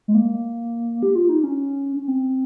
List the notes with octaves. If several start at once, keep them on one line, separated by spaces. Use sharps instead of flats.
G#3
A#3
G4
F4
D#4
C#4
C#4
C4